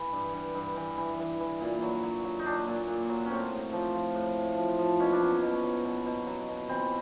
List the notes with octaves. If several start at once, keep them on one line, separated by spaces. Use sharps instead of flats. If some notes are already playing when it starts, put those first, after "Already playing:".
Already playing: E3
G2
G2
G2
E3
E3
E3
E3
A#2
F#3
F#3
F#3
D#4
A#2 D4
A#2
A#2
F#3
A2 C4 C#4
A2
F3
F3
A2
A2
F3
F3
B2 C#4
D4
F#3 C#4
B2
F#3
B2
B2
F#3
B2
E3 C4